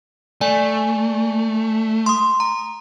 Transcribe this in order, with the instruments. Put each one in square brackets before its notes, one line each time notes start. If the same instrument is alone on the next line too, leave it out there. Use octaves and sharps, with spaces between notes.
[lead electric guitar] A3 [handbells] D5 G#5
[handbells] C6 D#6
A#5